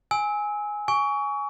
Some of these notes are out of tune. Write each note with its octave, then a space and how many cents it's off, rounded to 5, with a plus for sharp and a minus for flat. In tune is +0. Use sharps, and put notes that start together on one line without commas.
G#5 +0 E6 -30
G#5 +0 C#6 +25